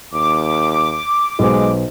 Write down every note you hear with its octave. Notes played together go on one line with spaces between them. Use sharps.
D#2 D6
B1 G#3 B3 C5